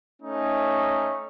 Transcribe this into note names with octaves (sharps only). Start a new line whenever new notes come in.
A3 C#4 D#4